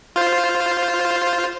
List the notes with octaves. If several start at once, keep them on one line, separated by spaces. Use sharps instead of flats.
F4 C5